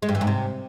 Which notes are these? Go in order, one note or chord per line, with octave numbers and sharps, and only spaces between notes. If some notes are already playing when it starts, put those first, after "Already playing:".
G#3
G2
E3
G#2
C3